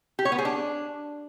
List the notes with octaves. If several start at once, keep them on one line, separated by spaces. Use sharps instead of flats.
G4
C#5
B3
G#4
D4